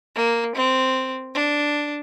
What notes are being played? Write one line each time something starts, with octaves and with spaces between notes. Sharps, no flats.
A#3
C4
D4